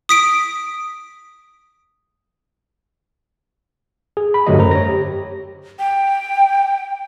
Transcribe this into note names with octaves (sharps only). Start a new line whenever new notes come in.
D#6 B6 D7
G#4
B5
G2 D3 F#3 A3 G4 D#5
F#2 A#4 C5 A#5
C#5 A#6
G4
G5